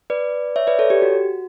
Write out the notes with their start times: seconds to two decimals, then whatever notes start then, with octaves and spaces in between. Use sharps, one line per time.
0.10 B4 D5
0.56 C#5 E5
0.67 B4 D5
0.79 A4 C#5
0.90 G4
1.02 F#4